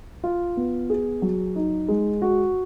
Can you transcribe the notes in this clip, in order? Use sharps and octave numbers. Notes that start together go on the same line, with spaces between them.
F4
B3
G#4
F#3
D#4
G#3
F#4